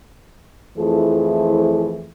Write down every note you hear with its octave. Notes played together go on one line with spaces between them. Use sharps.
F2 E3 F3 A3 E4 G#4